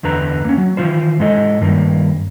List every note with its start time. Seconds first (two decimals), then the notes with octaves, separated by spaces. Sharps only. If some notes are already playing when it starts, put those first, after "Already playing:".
0.03 E2 D3 B4 A#5
0.45 A#3 C#4
0.58 F#3
0.77 D#3 E3 F4 C5
1.19 G#2 G#3 A4 D#5
1.61 G2 D#3 A#3